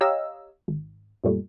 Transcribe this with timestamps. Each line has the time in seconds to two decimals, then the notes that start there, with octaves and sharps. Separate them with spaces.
0.01 G4 C#5 D#5 F5 A#5 E6
0.68 G#1
1.24 F#2 A#2 F3 G3 A3